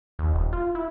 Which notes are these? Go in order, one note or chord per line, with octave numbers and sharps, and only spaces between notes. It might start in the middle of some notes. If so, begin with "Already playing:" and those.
D#2
D#1
F4
E4